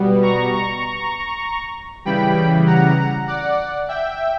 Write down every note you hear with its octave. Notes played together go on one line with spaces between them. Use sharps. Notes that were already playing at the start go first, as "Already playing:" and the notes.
Already playing: B2 G3 B3
A#5 C#6
A#5 C#6
C#3 E3 G3 G5 B5
F#5 A#5
D5 F#5
E5 G5